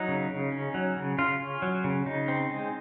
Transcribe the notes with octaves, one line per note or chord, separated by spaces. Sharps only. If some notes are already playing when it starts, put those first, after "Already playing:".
Already playing: F#3 D#4
C#3
C#3
C#4
F#3
C#3
C#3 F4
C#4
F#3
C#3
C#3 D#4
C4
G#3